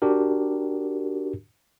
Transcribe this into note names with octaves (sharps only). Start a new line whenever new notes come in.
D4 F#4 G4 A#4